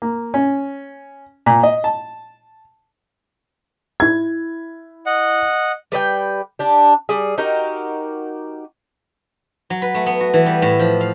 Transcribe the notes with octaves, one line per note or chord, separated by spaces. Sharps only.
A#3
C#4
A#2
D#5
A5
E4 G#6
D#5 F#5
G3 B4 D5 G5
D4 G4
G3 G#4
D#4 F#4 G4 A#4
F#3
B4
A3
B3
F#4
E3
G3
A2
F3
F5